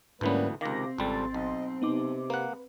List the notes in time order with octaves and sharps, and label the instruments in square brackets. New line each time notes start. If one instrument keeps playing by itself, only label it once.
[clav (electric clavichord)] D2 E3 B3 [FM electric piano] G#2 C#4 [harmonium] G3 A#3 B4
[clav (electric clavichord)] C#2 D#3 [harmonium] C3 [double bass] C4 [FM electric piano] F5 D6 A#6
[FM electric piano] G#1 C6 A6 [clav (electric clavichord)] C#2 G3 [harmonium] G4 A4
[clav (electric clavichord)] B1 [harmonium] D#5
[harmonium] C3 [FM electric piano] B3 D#4 D6
[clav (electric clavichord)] A#3 F#5 [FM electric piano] B4